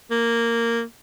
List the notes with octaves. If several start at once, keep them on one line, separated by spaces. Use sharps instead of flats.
A#3